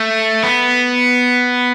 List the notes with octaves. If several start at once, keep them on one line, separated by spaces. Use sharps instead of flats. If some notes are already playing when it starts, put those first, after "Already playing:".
Already playing: A3
B3